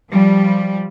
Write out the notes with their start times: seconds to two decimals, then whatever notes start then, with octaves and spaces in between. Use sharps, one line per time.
0.11 F3 G3